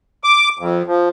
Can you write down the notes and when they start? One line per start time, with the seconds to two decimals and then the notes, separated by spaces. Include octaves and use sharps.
0.24 D6
0.59 F2
0.86 F3